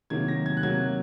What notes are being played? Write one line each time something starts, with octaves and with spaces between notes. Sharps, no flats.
C3 D#3 F#3 A#3 G#6
A#6
G#6
F#6
C3 F#3 A#3 G#6